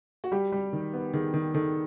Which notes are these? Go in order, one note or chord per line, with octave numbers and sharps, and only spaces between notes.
F#4
G3 G4
G3
D#3
B3
D#3 G#4
D#3
D#3 A4